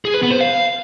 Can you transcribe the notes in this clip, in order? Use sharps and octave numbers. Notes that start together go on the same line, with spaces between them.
G#4
B4
B3
C5
F5